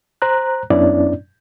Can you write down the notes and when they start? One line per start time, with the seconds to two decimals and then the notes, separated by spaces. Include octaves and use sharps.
0.22 C5 A#5 F#6
0.70 F#2 B3 C#4 D4 E4 D5